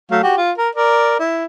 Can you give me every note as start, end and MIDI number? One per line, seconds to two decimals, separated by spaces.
0.11 0.21 54
0.11 0.21 57
0.11 0.21 77
0.23 0.37 66
0.23 0.37 67
0.37 0.51 65
0.58 0.69 70
0.75 1.17 70
0.75 1.17 74
1.19 1.44 64